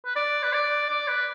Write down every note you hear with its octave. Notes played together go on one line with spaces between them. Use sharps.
B4
D5
B4
D5
D5
B4